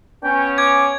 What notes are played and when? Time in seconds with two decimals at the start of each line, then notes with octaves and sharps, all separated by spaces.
0.23 B3 C#4 G5
0.58 D6 G#6